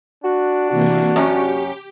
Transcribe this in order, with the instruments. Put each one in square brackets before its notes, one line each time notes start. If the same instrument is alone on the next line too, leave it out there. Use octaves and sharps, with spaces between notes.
[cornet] D4 [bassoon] F#4
[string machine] C3 E3 A#3 [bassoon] F#4
[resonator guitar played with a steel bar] F#2 C#4 [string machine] G4